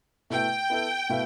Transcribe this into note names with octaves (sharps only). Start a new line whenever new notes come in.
B2 A3 E4 B4 G5
B3 E4 A4 E5
B2 A3 E4 B4 F5